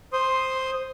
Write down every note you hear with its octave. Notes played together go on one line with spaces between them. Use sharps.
C5 C6 D#6